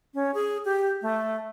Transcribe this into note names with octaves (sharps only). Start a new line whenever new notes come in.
C#4
G#4
G4
A3